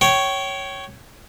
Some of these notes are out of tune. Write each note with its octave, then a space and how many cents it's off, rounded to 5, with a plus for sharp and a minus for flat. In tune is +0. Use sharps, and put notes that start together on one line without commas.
C#5 +0 G5 -30